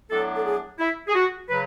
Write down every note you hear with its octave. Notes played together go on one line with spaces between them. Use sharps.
A2 F#3 B3 D4 A4
A4
G#4
E4
G#4
F#4
C#3 F#3 B4